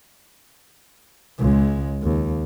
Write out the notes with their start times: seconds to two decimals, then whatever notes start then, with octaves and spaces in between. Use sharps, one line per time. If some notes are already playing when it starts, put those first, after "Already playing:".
1.39 C#2 G#3
2.03 D#2